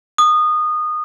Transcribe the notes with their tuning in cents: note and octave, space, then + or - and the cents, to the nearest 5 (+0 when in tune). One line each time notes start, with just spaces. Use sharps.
D#6 -20